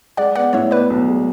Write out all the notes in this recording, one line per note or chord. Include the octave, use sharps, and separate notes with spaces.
G#3 D5 F#5
B3 D5 F#5
A2 C#5 E5
B3 B4 D5
B1
G#3